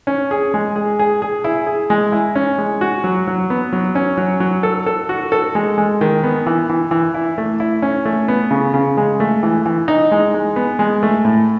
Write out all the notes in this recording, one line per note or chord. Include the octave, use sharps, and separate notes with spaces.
C#4
G#4
G#3
G#4
G#4
G#4
E4
G#4
G#3
E4
C#4
G#3
F#4
F#3
F#3
B3
F#3
C#4
F#3
F#3
A4
A4
F#4
A4
G#3
G#3
D#3
B3
E3
E3
E3
E4
A3
E4
C#4
A3
B3
C#3
C#3
G#3
A3
E3
E3
D#4
G#3
G#3
B3
G#3
A3
A2